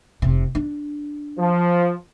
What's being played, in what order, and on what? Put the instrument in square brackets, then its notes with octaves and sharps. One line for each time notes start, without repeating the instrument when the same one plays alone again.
[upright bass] F1 C3
D4
[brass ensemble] F3